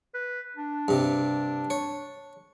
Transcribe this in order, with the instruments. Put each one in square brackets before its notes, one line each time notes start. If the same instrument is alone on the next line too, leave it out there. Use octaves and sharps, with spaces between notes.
[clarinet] B4
D4
[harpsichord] G2 C3
C#5